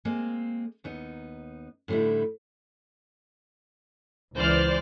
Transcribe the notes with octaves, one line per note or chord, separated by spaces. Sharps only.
G#3 A#3 C4
D#2 B3 D#4
A2 D3 G3 D#4 E4
C#2 E3 C5 D5 F6